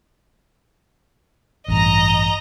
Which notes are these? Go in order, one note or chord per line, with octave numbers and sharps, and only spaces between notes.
A1 G2 D#5 A#5